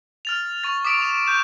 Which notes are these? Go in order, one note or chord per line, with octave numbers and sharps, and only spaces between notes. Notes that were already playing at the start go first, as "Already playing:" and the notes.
F6 A6 F7
C#6 A6
D6 D#6 B6 D7
C#6 E7
C#6 G6 E7